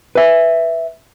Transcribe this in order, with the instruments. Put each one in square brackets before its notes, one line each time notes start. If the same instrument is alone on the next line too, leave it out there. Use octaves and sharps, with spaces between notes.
[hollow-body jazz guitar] B4 E5